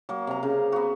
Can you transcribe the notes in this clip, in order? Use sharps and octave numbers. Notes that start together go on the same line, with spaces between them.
F#3 A#3
C3 A#5
C#3
B3 F#4